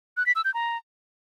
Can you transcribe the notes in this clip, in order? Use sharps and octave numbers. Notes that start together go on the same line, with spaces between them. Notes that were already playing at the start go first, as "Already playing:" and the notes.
F#6
B6
E6
G6
A#5